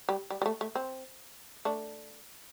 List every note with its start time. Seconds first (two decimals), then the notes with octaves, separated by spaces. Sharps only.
0.09 G3
0.30 G3
0.42 G3
0.46 A3
0.61 A3
0.75 C4
1.65 A3 D4